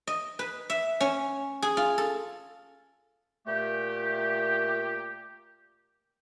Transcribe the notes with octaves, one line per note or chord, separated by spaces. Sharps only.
D#5
B4
E5
C#4
G#4
F4
A4
A#2 A3 G4